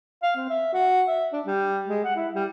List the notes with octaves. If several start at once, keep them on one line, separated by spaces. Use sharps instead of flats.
F5
C4
E5
F#4
E5
D4
G3
G#3
F#5
E4
G3